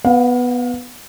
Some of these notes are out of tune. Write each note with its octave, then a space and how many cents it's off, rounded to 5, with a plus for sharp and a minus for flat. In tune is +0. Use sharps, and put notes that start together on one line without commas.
B3 +0 F5 +35